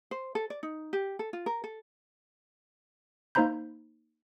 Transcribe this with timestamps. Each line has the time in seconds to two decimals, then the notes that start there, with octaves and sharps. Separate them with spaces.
0.11 C5
0.35 A4
0.50 D5
0.63 D#4
0.93 G4
1.19 A4
1.33 F4
1.46 A#4
1.64 A4
3.35 A#3 D#4 C5 A#5 B5 G6